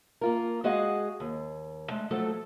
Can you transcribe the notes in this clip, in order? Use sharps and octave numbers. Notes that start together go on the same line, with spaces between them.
A#3 F4 A#4
G#3 F#4 G#4 D#5 F5 F#5
D#2
G#3 A3
F3 F#3 A3 A4